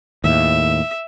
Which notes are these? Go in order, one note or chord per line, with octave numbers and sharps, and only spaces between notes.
D#2 A2 E5